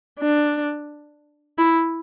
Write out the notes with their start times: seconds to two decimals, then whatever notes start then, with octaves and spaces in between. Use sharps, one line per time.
0.20 D4
1.59 E4